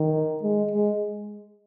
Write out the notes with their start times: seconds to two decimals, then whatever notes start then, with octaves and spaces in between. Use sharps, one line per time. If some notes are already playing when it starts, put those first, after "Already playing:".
Already playing: D#3
0.43 G#3
0.71 G#3